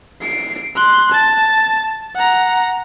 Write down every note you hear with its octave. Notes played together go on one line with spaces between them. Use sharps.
C7 D7
C6 F#6
A5 A6
F#5 A#5